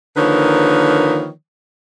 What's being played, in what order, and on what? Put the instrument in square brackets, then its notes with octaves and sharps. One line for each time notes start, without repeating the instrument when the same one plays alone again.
[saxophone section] D3 D#3 F3 A#3 B4 C#5